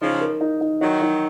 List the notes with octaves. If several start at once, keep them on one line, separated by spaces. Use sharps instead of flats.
C#3 F3 D#4
A#4
D#4
D#4
D#3 F#3 D#4
D#4